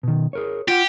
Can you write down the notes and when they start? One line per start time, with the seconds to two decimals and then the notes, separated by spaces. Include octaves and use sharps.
0.03 B2 D#3
0.33 G#4 A#4 C#5
0.68 F4 G4 F#5